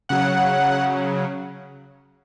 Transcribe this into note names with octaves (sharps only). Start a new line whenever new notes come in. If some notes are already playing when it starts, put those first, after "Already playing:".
C#3 F#3 F#5